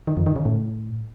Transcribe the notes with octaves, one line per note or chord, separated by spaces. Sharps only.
D#3
F2
D#3
C#3
A2